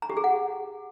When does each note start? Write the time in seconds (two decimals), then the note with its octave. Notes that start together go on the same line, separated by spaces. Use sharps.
0.02 A#5
0.09 G4
0.17 G#4
0.24 F#5